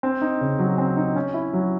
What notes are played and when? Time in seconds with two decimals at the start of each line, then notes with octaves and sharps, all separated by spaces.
0.03 C4
0.22 D#4
0.41 C#3
0.59 F#3
0.78 C4
0.97 D#4
1.16 C#4
1.34 E4
1.53 F#3